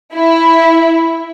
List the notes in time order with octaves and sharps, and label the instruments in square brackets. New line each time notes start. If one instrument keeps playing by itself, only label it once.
[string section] E4